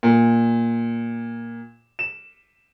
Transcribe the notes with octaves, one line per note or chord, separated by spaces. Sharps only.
A#2
E7